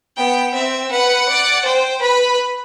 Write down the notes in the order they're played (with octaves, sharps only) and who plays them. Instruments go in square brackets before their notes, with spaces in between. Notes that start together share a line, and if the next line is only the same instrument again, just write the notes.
[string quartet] B3 [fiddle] G5
[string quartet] C4 [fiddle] E5
[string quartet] B4 [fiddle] F#5
[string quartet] D5
[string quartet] C5 [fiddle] G5
[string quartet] B4 [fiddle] B5